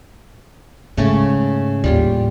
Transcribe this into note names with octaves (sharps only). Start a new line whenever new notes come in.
G#2 C#3 A3 C#4
D#2 A2 G3 F4 G4